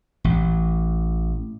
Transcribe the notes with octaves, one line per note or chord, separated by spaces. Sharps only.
A1